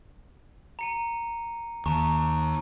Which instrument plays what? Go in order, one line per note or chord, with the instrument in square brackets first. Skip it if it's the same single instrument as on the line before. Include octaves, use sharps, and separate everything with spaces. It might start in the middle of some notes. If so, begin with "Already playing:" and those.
[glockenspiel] A#5 C#7 D#7
[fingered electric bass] D#2 [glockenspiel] A5 A#5 C#6